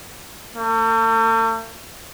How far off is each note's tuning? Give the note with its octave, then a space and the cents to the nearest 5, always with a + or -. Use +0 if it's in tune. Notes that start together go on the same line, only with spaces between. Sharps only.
A3 +45